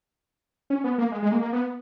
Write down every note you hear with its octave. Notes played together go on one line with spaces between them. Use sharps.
C#4
B3
A#3
G#3
G#3
A#3
A#3
B3